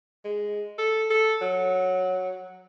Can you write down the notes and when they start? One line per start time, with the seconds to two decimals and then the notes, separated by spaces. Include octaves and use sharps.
0.25 G#3
0.78 A4
1.10 A4
1.41 F#3